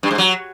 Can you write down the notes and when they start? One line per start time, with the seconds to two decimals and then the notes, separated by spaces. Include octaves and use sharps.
0.03 G2
0.11 G#2
0.18 F#3